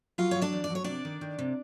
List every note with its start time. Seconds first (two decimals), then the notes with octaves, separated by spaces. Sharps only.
0.18 F#3 F4 F5
0.31 F#3 C#5
0.41 D4 D5
0.52 E2
0.64 D5
0.70 F#3 C#5
0.84 C3 D4 D5
1.05 D#3
1.21 D#3
1.39 C3